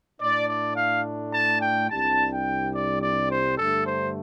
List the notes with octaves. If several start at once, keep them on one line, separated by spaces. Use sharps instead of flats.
A2 A3 D4 D5
D5
F5
A5
G5
C2 C3 G3 D4 A5
G5
D5
D5
C5
G2 D3 A3 A4
C5